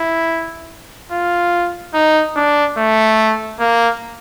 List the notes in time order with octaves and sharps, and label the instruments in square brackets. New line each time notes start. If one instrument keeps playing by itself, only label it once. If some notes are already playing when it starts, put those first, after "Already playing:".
Already playing: [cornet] E4
F4
D#4
D4
A3
A#3